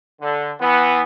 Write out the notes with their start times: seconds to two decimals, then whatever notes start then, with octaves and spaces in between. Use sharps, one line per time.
0.21 D3
0.61 E3 B3